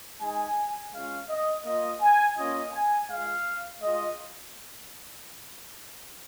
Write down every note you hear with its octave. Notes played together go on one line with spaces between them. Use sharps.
G#3 D#4 G#5
G#3 C#4 F4 F5
D#5
A#3 F4 D#5
G#5
A#3 C#4 F4 D#5
G#5
G#3 F4 F5
G#3 F4 D#5